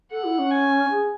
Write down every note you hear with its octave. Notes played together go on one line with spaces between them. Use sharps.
A4 F#5
E4
C#4
G#5
G#4